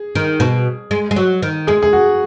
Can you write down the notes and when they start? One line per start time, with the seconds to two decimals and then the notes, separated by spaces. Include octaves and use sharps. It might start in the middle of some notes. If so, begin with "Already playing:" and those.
Already playing: G#4
0.15 D#3
0.40 B2
0.91 G#3
1.11 G#3
1.16 F#3
1.42 D#3
1.67 G#3 G#4
1.82 G#4
1.93 F#4